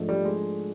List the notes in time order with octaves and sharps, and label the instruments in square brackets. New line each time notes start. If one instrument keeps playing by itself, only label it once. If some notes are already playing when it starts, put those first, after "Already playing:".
Already playing: [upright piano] G#2 F3 A3 D4
[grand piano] G3
G#3